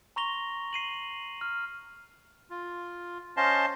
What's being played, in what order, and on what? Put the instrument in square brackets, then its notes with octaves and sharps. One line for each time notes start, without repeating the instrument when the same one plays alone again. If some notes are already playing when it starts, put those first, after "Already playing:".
[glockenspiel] A#5 C6 C#6 A#6 F7 G7
C7 D#7 F#7
F6
[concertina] F4
C#4 C5 D#5 F5 A5 C6